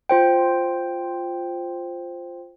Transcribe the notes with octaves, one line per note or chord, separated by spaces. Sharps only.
F4 C5 G5